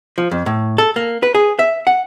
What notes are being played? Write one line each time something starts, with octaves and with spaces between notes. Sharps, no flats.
F3
F2
A2
A4
A#3
B4
G#4
E5
F#5